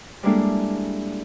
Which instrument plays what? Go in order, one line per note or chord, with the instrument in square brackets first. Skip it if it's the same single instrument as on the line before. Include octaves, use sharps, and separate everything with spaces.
[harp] G3 G#3 A#3 D4 E4 A4